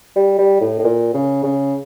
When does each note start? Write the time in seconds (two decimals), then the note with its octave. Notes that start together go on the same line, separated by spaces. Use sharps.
0.16 G3
0.39 G3
0.61 A2
0.79 A2
0.84 A#2
1.14 C#3
1.43 C#3